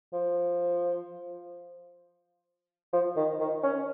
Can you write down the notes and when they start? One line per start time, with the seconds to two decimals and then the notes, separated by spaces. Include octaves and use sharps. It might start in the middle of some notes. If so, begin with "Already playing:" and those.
0.13 F3
2.93 F3
3.16 D#3
3.40 D#3
3.63 C#4